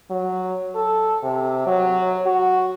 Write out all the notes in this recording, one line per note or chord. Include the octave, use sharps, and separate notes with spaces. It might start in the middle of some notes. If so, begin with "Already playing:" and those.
F#3
A4
C3
F#3
F#4